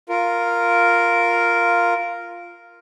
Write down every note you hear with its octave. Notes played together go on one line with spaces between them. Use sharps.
F4 A#4